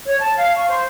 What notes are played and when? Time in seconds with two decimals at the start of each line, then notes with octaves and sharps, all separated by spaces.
0.06 C#5
0.20 A5
0.37 F5
0.56 C#6
0.68 C5